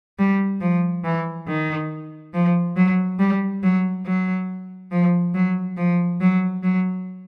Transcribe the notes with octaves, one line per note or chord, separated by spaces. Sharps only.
G3
F3
E3
D#3
F3
F#3
G3
F#3
F#3
F3
F#3
F3
F#3
F#3